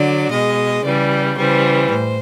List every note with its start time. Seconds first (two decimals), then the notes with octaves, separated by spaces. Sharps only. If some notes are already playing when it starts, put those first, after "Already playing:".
Already playing: D3 F#3 D5
0.30 B2 G#3 D#5
0.83 C#3 E3 G3 D5
1.36 C#3 E3 G3 C5
1.91 A2 C5